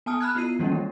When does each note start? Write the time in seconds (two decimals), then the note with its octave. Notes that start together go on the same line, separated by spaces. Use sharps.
0.06 B3 G#5 A5 D#6 F6
0.21 B5 F6 F#6 G#6
0.35 B3 E4 F4 C7 D#7
0.59 D#3 E3 G3 A#3 C#4 D4
0.72 G#3